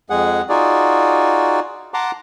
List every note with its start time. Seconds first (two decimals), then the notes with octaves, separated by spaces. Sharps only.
0.10 F2 G#3 G#4 F#5
0.49 D#4 F4 F#4 G#4 D5
1.94 F#5 A5 A#5 C6 D6